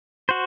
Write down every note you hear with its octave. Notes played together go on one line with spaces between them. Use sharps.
F#4 C5